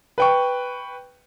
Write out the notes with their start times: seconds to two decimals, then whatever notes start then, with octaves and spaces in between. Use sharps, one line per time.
0.18 B4 G5 C#6